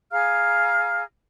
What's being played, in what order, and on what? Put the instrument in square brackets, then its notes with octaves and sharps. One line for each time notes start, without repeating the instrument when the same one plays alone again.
[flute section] G#4 F5 A#5 F6